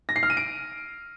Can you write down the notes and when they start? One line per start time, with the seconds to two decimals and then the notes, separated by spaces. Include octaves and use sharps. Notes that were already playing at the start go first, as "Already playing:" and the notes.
0.09 A#6
0.16 C7
0.23 F6
0.30 D#7
0.37 D7